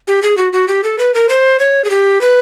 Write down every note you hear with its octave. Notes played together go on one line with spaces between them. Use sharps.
G4
G#4
F#4
F#4
G4
A4
B4
A#4
C5
C#5
G#4
G4
B4